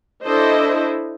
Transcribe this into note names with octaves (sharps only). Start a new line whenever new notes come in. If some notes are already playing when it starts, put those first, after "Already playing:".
D4 E4 A4 C5 D#5